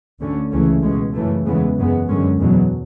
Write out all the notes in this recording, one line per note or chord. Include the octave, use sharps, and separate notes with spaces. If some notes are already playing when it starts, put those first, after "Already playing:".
D2 D3 A3 C#4
C#2 C#3 E3 A3 C#4
C#2 B2 G#3 C#4
F#2 C#3 E3 A3
E2 C#3 E3 G#3 B3
F#2 C#3 G#3 B3
F#2 D3 G#3 C#4
E2 B2 F#3